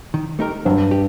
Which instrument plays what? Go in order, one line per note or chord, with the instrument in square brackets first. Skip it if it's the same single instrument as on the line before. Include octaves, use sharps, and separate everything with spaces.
[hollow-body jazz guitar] D#3
A3 D#4 G4 A#4
[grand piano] G2 [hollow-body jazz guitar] F#3
[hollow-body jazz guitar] G4